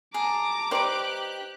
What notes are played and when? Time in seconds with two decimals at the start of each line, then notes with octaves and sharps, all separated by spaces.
0.14 G#4 A5 A#5 D6
0.71 G3 D#4 G4 B4 C5 D5 F#6